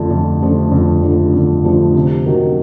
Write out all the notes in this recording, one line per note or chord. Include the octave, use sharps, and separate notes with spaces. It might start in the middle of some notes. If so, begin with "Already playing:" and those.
Already playing: F2 D3 F3 A3 D4
F2
D3 F3 A3 D4
F2
D3 F3 A3 D4
F2
D3 F3 A3 D4
C3
D#3 F#3 A#3